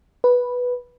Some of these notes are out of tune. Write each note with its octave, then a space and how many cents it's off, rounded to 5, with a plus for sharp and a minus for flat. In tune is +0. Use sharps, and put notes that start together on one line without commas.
B4 -5